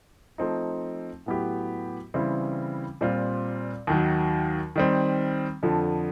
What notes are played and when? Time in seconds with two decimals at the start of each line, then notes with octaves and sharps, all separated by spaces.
0.38 F3 A3 C4 D#4
1.26 A2 F#3 B3 E4 G4
2.14 C#3 E3 G3 C4 E4
3.01 A#2 G3 C4 F4
3.87 D#2 D#3 F#3
4.76 D#3 G3 C4
5.63 F2 D3 F3